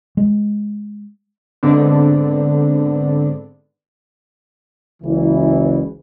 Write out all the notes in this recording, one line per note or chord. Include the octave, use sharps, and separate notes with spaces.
G#3
G#2 D3 B3 C4 D4
F#1 C#2 C#3 E3